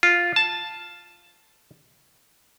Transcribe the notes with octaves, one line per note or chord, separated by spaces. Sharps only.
F4
A5